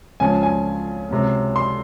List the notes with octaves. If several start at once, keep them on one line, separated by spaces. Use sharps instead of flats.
C#2 C#3 F3 G#5
G#5
C#2 C3 F#3
C6